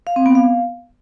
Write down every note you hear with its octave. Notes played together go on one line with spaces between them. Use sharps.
F5
C4
B3
F5